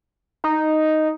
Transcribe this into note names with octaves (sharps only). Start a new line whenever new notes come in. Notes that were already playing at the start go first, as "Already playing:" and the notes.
D#4